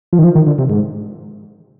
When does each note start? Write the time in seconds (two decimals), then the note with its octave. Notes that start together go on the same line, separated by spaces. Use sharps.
0.13 F3
0.19 D#3
0.24 F3
0.35 D#3
0.47 D3
0.59 C3
0.70 G#2